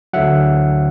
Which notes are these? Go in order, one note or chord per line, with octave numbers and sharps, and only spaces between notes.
D2 D3 F#3 E5 F#5